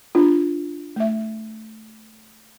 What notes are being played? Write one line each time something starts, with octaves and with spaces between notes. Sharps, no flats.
D4 F4
A3 E5